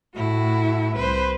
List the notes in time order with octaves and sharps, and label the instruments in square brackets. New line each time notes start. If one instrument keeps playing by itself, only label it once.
[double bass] A2 [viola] E4 F#4
[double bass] C2 [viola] B4 C5